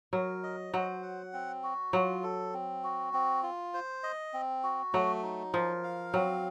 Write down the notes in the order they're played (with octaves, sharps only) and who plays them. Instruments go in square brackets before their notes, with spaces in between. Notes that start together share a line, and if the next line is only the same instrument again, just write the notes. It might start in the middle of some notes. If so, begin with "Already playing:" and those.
[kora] F#3 [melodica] A#4
[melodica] D#5
[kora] F#3 [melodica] C5
[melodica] F#5
C4
F#4
[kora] F#3 [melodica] F4
[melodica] A4
C4
F#4
C4
F4
C5
D#5
C4
F#4
[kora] F#3 [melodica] A3
[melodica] D#4
[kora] F3 [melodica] A#4
[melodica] F5
[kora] F#3 [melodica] C4